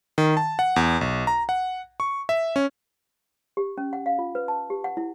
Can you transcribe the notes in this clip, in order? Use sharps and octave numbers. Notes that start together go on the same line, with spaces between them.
D#3
A5
F#5
E2
B1
A#5
F#5
C#6
E5
C#4
G4
C#4
F#5
F5
F4
B4
A5
G4
F#5
E4